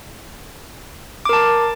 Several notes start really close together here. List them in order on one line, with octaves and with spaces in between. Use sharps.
D6 A#4 A5